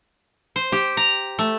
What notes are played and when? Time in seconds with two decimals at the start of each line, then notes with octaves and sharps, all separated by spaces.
0.56 C5
0.72 G4
0.97 A#5
1.39 A3